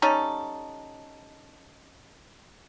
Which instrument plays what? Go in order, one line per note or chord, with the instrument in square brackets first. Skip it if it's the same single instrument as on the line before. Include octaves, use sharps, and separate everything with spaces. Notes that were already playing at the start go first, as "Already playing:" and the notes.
[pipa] G3 C#4 D#4 A4